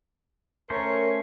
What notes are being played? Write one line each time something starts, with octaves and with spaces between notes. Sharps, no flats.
A3 C#4 A#4 C5 C#5